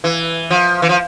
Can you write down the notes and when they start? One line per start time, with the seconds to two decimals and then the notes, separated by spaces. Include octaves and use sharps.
0.04 E3
0.51 F3
0.82 E3
0.89 F3